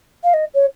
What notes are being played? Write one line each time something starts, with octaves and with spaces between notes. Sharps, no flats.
F5
D#5
C#5